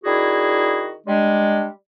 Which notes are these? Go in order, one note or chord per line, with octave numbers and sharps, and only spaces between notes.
D#3 D4 E4 F#4 G#4
G3 G#3 D4